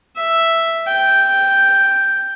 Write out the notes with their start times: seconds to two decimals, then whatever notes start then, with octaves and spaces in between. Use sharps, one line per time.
0.16 E5
0.88 G5